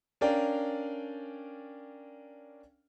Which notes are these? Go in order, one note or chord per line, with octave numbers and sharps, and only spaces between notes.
C#4 D4 A#4 D5 F5 G5